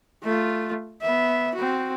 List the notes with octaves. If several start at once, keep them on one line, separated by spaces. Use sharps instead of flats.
A3 F4
B3 E5
C4 F#4